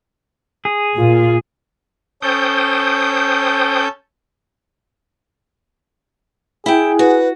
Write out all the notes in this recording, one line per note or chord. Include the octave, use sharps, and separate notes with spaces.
G#4
A#2 F4
C#4 A4 C5 G5 D#6 G6
E4 G#4 G5
F#4 B4